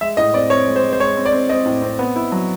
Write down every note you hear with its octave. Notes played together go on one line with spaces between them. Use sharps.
G#3 E5
A2 D#5
C4 D5
C4 C#5
G#3
C5
G#3
C5
G#3 C#5
C4
D5
C4
C4 D#5
A2
C4
B3
E4
F#3